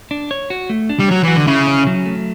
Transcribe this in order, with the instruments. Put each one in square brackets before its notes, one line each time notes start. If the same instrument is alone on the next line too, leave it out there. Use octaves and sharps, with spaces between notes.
[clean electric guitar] D4
C#5
F#4
A3
D4
[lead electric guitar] G3
[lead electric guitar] F#3 [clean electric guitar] C#5
[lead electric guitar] E3 [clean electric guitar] F#4
[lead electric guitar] D3
[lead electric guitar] C#3 [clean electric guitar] E4
[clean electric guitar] C#4
F#3
A3